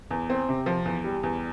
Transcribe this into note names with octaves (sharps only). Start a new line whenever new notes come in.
E2
C4
C3
F3
E2
G3
E2